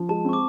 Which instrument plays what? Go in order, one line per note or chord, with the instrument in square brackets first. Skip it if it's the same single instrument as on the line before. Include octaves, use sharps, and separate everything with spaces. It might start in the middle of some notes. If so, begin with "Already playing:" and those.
Already playing: [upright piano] F3
[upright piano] G#3 [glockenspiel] A5
[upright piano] C4 [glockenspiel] C#6
[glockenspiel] D6